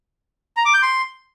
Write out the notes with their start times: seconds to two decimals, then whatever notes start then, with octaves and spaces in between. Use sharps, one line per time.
0.57 A#5
0.65 D6
0.74 G6
0.82 C6